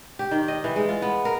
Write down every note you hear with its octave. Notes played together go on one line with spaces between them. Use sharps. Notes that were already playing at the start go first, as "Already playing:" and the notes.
G4
D#3
D#5
E3
G#3
F4
B3
A#4